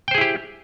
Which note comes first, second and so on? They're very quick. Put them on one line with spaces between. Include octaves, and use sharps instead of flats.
G5 C5 G#4 E4 G4